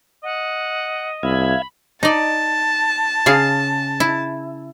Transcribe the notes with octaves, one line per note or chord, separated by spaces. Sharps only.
D#5 F#5
C2 E5 F5 B5 G#6
D#4 D5 A5
C#3 G#4 F5
E4